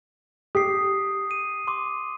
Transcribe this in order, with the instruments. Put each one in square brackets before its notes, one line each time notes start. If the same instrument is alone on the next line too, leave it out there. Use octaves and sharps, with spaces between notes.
[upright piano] G4 [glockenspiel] D#6 C7
[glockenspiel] D#7
C6 D6